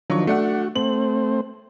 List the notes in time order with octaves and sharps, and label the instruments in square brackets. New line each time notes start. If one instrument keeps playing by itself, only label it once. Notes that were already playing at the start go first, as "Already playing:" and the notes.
[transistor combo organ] D#3 F3 D4 [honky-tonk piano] F#3 C#6
[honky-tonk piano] A3 D4 F#5 [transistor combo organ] F#4
[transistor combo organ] A3 C4 C5 [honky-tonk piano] F#7